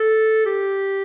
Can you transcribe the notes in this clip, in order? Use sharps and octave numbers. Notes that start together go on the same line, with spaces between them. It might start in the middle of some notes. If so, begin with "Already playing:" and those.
Already playing: A4
G4